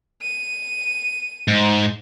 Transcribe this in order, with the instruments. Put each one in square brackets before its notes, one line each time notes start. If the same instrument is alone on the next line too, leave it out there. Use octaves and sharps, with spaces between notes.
[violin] D#7
[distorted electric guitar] G#2